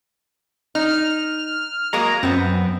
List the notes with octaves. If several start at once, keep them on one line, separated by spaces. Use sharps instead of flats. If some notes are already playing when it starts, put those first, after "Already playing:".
D#4 F6
F#3 G#3 A#3 A#5
F#2 B3 C4